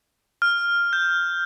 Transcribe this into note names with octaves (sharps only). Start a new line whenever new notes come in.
F6
G6